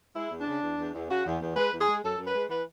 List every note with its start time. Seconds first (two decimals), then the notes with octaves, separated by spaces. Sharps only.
0.16 G#3 E4
0.31 E2
0.40 D4
0.47 C#3
0.62 E2
0.79 E2
0.94 E2
1.09 C#3 F#4
1.26 E2
1.41 E2
1.56 G#3 B4
1.73 E2
1.79 G#4
1.88 G#3
2.03 F#2 A4
2.18 F#2
2.26 B4
2.35 G#3
2.49 E3 B4